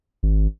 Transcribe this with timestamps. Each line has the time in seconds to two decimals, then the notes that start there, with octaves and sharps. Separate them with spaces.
0.23 G#1